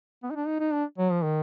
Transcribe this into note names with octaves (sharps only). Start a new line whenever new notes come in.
B3
D#4
D4
D#4
D#4
D4
F#3
F3
D#3